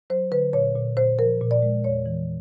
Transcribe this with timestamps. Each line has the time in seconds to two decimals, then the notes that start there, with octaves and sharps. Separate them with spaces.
0.10 F#3 C5
0.31 D3 B4
0.53 A#2 C#5
0.75 A#2
0.97 A#2 C5
1.19 F3 A#4
1.41 A#2
1.51 D5
1.62 G#3
1.84 E2 C#5
2.06 E3